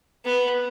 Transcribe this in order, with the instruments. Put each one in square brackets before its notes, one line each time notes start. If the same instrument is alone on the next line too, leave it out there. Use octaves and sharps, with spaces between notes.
[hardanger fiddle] B3